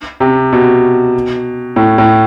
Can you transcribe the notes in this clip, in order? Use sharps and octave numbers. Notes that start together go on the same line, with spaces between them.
C3
B2
A2
A2